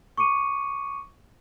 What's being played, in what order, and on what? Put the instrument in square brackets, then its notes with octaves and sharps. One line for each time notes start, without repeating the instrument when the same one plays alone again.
[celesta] C#6 D6 C#7 D#7